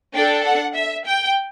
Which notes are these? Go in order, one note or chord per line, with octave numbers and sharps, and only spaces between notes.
D4 A4 G5
F#5
E5
G5